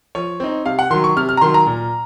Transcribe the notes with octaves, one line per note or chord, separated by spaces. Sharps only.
F3 C#5
C4 D#4
C3 F5
F#5
D#3 F#3 C6
C#6
C3 F6
F6
A#5
D#3 F#3 C6
A#5
A#2